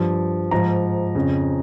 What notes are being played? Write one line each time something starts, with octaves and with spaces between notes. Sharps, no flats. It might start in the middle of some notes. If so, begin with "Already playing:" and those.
Already playing: G2 F3
G#2 F3 A#5
F2 C#3 F3